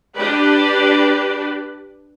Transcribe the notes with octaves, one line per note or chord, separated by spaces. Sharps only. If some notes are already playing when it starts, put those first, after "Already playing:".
D4 G4 B4 D5